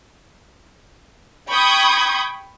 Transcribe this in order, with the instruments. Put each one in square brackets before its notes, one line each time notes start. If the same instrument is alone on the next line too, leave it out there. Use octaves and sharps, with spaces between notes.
[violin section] G5 B5 C#6 D#6 G6 G#6